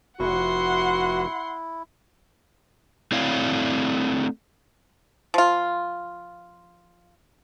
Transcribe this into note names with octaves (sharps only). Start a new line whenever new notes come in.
F1 E4 F#4 F#5 C6
A3 C4 E4 C#5 D5 F5
F3 F4